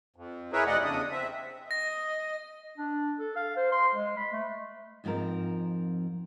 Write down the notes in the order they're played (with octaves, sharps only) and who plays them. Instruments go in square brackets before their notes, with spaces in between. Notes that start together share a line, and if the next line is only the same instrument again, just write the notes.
[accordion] F2
E4 G#4 A#4 B4 C#5 E5
F2 C3 A3 D5 D#5 F#5
E2 C#3 D4 D#6
C4 E5
[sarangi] D#5 [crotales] A#6
[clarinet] D4
A4
F5
C5
C6
G#3
B5
A3
[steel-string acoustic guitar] F2 G#2 F3 C4 A#4